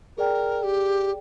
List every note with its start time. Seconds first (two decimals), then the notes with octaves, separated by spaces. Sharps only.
0.17 G#4 A#4 D5 G5
0.63 G4